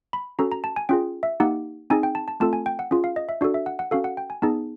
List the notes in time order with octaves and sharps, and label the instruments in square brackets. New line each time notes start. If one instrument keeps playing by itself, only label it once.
[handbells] B5
C#4 F#4 A4 A#5
A#5
A5
G#5
C#4 F4 G#4 G5
E5
A#3 D#4 G4 F#5
C4 D#4 G#4 G#5
G5
A5
A5
A3 C4 F4 A4 A5
G#5
G5
F#5
C#4 F4 G#4
F5
D#5
E5
D4 F#4 A4 D5
E5
F#5
F#5
C#4 F#4 A4 F5
F#5
G5
G#5
B3 D#4 G#4 A5